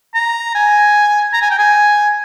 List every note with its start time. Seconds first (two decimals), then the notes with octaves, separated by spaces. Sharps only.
0.14 A#5
0.55 G#5
1.33 A#5
1.42 G#5
1.51 G5
1.58 G#5